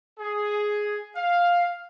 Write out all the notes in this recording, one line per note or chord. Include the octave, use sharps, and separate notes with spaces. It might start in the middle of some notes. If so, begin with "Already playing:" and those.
G#4
F5